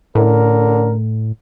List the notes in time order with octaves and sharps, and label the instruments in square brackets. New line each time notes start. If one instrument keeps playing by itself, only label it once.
[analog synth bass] A2 [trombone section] D3 C#4 A#4